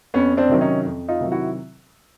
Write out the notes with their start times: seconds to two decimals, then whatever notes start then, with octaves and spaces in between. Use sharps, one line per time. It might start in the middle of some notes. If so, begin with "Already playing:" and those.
0.14 F2 B3 C#4
0.37 C4 D4
0.49 C3 D#3 F#3
0.61 C#4 D#4
0.85 F2
1.08 D#4 F4
1.21 C3 D#3 F#3
1.32 E4 F#4